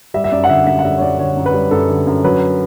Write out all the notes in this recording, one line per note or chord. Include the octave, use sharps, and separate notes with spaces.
G3 E5
E5
F#2 D5
F#5
D3 E5
F#2 E5
F#5
G3 E5
C#5
F#2 D5
D3 C#5
F#2
B4
G3
F#2 A4
D3
F#2
F#3 B4